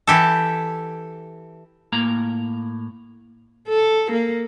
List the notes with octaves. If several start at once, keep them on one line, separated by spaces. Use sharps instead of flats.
E3 G4 A4
A2 A#3 A#5
A4
A#3